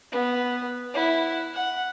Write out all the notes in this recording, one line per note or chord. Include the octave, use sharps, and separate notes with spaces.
B3
E4 F#5
F#5